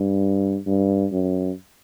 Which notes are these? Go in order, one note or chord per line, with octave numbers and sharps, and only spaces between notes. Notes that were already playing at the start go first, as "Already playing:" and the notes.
Already playing: G2
G2
F#2